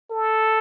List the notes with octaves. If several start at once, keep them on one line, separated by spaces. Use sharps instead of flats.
A4